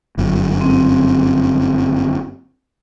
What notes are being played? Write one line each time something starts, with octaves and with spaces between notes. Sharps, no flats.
G1 F#2
C4